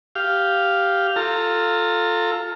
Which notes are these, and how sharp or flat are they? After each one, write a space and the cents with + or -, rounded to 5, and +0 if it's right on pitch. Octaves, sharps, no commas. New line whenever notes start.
G4 +0 F5 +0
F4 +10 A4 +0 A#5 -25